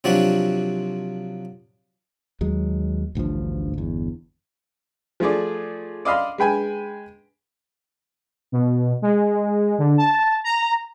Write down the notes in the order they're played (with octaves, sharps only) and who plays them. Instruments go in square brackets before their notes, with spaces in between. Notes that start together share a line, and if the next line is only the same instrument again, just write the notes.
[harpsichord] C3 F3 F#3 D4 F#4
[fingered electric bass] D#2 F#3 G#3
A1 D2 G2 F3
G1 E2
[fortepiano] F3 A3 G#4 D5
D5 D#5 F5 B5 C6
G#3 B4 G5 G#5
[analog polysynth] B2
G#3
D3
A5
A#5